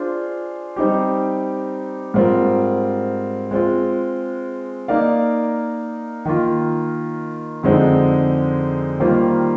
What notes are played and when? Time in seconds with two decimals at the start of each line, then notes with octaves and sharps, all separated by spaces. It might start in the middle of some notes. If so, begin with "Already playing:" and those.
Already playing: D4 F4 G#4 C5
0.76 G3 C4 D#4 G4
2.14 G#2 G3 C4 F4 A#4
3.51 G#3 C4 F4
4.88 A#3 D#4 A#4 D5 F5
6.25 D#3 A#3 F4
7.63 F2 D3 G#3 C4 D#4
8.99 D#3 G3 A#3 F4 C5